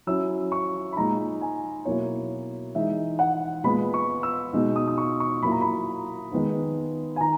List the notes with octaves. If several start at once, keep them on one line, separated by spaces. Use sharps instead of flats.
F#3 C#4 E4 E6
C#6
B5
A#2 G#3 D#4 A#5
G#5
B2 F#3 A#3 E4 C#5
E3 G#3 D#4 E5
F#5
A#2 G#3 B3 B5
C#6
E6
B2 G#3 D#4
D#6
D#6
C#6
C#6
A#2 F#3 A#3 E4 B5
A#5
B5
D#3 G#3 B3 D#4
G#5
D#3 A#5